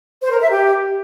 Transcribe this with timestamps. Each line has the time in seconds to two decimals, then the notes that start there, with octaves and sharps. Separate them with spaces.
0.21 C5
0.31 A#4
0.40 E5
0.50 G4